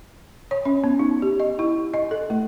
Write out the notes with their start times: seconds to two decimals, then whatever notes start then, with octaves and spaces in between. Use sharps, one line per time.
0.51 C#5
0.65 C#4
0.84 B3
0.99 D#4
1.22 G4
1.40 D#5
1.59 E4
1.94 D#5
2.11 A4
2.30 A3